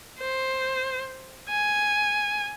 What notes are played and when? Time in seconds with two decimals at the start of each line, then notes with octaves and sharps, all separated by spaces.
0.19 C5
1.50 G#5